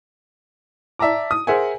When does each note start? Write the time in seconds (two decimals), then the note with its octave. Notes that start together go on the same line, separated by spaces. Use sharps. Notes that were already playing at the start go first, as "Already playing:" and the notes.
0.99 D5 E5 A5 A#5 D6
1.31 D#6
1.47 G#4 A#4 C5 E5 F#5 G#5